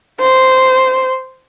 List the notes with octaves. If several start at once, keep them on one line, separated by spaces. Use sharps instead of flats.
C5